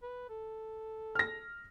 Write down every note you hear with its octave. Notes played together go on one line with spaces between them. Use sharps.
B4
A4
F6 A#6